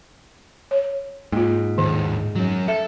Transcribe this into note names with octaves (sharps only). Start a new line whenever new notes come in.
C#5
G#2 A#3 F4
D#2 A2 D#3
F#3 C#4
A4 E5